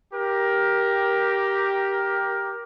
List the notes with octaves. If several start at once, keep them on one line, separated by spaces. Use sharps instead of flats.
G4 A#4